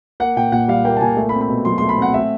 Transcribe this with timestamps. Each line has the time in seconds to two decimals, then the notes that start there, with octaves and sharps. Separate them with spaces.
0.20 A#3 F#5
0.37 A#2 G5
0.52 A#2 F#5
0.68 G3 F5
0.85 A#3 G5
0.97 A5
1.01 A#2 G#5
1.17 A3
1.29 B5
1.33 C4
1.41 B5
1.49 B2
1.65 F#3 C6
1.78 A3 C6
1.89 B5
1.97 C4 F#5
2.13 A3 E5